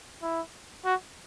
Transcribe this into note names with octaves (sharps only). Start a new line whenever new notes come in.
E4
F#4